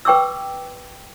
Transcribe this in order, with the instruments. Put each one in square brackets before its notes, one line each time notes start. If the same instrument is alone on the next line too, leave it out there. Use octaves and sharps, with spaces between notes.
[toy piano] B4 G5 C#6 D6 E6